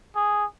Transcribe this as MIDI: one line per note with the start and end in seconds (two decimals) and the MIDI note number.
0.15 0.44 68